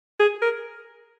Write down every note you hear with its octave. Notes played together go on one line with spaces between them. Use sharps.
G#4
A#4